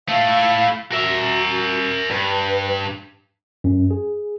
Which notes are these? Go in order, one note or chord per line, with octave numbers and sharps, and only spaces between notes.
A3 E4 F5
F#4 A#4 E5
G2 B4
F#2
G#4